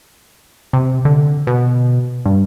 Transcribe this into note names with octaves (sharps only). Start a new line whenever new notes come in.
C3
D3
B2
G2